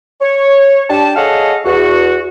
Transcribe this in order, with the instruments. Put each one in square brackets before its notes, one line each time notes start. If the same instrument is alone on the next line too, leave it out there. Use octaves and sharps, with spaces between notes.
[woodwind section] C#5
D4 G4 A5
G#4 A4 C#5 D#5 F5 F#5
E2 F#4